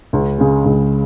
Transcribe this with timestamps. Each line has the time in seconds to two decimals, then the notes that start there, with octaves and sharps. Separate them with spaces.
0.13 C#2
0.38 C#3 G#3
0.65 C#2